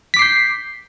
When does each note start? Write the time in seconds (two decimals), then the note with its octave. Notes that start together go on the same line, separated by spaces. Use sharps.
0.14 B6
0.17 D6
0.19 C7
0.22 G6